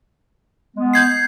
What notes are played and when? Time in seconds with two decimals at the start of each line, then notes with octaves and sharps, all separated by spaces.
0.77 G#3 B3
0.93 G6 G#6 C7